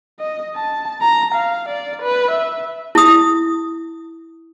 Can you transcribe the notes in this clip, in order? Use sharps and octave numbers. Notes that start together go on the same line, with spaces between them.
D#5
A5
A#5
F5
D5
B4
E5
E4 D#6